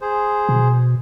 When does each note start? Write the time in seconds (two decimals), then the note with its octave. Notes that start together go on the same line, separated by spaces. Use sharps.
0.01 G#4 C5
0.49 B2